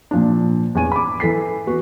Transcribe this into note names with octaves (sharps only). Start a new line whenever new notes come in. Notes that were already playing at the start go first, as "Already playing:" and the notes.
A#2 F3 D4
E2 C#4 G#5 D#7
B5 D6
E3 A4 B6 C7
B3 F#4